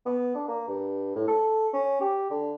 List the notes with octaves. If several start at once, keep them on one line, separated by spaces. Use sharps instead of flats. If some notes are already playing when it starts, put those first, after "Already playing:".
B3
D4
A#3
G2
A2
A4
C#4
G4
D3